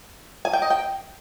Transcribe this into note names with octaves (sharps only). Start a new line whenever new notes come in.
G#5
G5
D#5
G5